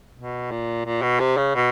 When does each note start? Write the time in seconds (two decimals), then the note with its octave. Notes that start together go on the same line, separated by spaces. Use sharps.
0.15 B2
0.51 A#2
0.85 A#2
1.02 B2
1.20 C3
1.37 C#3
1.55 B2